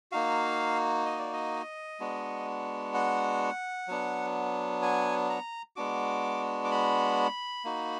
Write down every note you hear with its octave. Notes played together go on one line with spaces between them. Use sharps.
A#3 D#4 F#4 F5
D#5
D5
D#5
G#3 B3 D4 F#4
F#5
F#3 B3 D4
G#5
A#5
G#3 B3 D4 F#4 D6
D6
B5
A#3 D#4 F#4